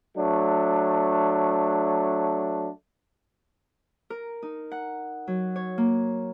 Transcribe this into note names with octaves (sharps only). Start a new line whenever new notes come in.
F#3 A3 D4
A#4
D#4
F#5
F#3
C#5
A#3